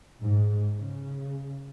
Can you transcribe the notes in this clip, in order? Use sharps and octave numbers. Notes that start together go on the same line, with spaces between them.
G#2
C#3